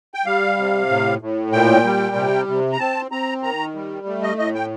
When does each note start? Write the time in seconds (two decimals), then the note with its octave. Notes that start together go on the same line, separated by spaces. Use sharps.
0.14 G5
0.26 G3 F5
0.57 C3
0.89 A2
1.21 A2
1.52 A#2 G5
1.84 G3
2.16 C3
2.48 C3
2.73 A#5
2.79 C4 A5
3.11 C4 A#5
3.43 D#3 A#5
3.75 G3
4.07 A3
4.23 D#5
4.38 A2 D#5
4.55 G5